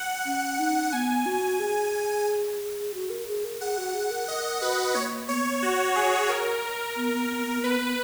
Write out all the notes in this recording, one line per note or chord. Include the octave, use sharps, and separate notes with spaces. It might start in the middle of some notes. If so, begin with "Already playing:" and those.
Already playing: F#5
C#4
D#4
B3 G#5
F#4
G#4
F#4
A#4
G#4
A#4
G#4 F#5
F#4
G#4
A#4
A#4 D#5
F#4 B4
A#3 C#5
B3 C#5
F#4
G#4
A#4
B3
B3
B3
B3
B3 B4
B3